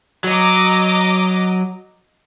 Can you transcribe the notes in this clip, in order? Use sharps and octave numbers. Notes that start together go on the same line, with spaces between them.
F#3 D#5 A#5 D6